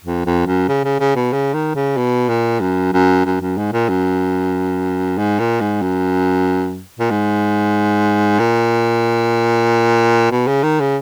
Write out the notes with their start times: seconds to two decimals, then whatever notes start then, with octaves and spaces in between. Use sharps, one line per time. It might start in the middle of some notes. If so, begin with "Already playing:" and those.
0.04 F2
0.26 F2
0.46 F#2
0.69 C#3
0.84 C#3
1.00 C#3
1.16 B2
1.33 C#3
1.54 D#3
1.76 C#3
1.97 B2
2.29 A#2
2.60 F#2
2.93 F#2
3.25 F#2
3.41 F#2
3.58 G#2
3.73 A#2
3.89 F#2
5.18 G#2
5.39 A#2
5.61 G#2
5.82 F#2
6.99 A#2
7.10 G#2
8.39 A#2
10.31 B2
10.47 C#3
10.64 D#3
10.80 C#3